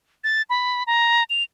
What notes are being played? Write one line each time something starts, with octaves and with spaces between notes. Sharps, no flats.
A6
B5
A#5
F7